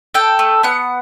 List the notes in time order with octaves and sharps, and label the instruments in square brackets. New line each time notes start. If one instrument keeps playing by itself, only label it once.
[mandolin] A4 G5
A3
B3 F#5